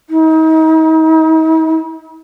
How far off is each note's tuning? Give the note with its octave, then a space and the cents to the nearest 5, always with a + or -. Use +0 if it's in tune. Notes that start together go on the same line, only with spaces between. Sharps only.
D#4 +40